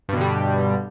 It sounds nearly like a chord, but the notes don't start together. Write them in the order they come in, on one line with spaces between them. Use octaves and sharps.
G2 B2 D3 G3